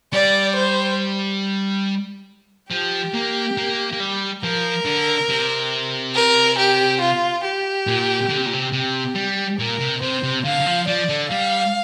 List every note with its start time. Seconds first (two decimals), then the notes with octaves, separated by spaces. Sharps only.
0.13 G3 D5
0.56 C5
2.70 F3 G4
3.14 A#3
3.57 A#3
3.92 A#3
4.00 G3
4.42 F3 A#4
4.85 D3
5.29 C3
6.15 A#4
6.58 G4
7.00 F4
7.44 G4
7.87 A#2
8.29 D3
8.37 C3
8.46 A#2
8.53 C3
8.72 C3 G4
9.15 G3
9.59 A#2 A#4
9.80 C3
10.02 C3 C5
10.23 C3
10.45 D3 F5
10.60 D3
10.66 F3
10.87 F3 D5
11.09 D3
11.30 G3 F5